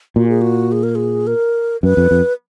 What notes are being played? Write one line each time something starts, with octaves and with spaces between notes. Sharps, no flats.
A#2 F#4
G#4
F#4
G#4
A#4
G#4
A#4
F#2 B4
F2
F2